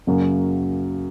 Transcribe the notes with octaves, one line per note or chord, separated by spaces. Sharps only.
F#2 C#3 F#3 A#3